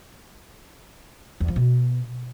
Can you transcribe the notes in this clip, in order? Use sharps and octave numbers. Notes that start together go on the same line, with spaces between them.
E2
F3
B2